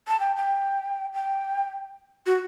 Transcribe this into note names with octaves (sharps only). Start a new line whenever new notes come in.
A5
G5
G5
G5
F#4